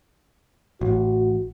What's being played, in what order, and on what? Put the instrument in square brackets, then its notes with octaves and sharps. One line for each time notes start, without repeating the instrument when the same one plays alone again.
[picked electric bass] A1 [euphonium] F#4